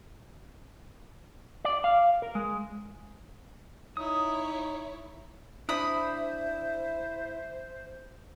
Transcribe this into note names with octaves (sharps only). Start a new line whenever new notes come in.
D5
F5
A#4
G#3
D#4 E4 C#5 D#6
D4 E4 C5 E5 B5 D#6